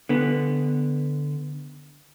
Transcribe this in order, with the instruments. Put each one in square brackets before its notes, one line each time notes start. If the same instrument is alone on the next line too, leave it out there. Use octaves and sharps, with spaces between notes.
[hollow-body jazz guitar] D3 B3